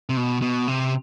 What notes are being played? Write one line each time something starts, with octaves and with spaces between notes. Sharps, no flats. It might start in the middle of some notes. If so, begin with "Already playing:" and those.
C3
B2
B2
C3